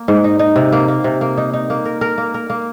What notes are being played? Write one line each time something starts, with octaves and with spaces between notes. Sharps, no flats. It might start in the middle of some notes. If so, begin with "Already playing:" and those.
Already playing: A#3
G#2
D#4
D#4
C3
A#3
A#3
C3
A#3
D#4
D#4
A#3
A#4
A#4
A#3
A#4
A#3